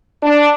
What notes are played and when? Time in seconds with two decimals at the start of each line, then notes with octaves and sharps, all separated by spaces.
0.23 D4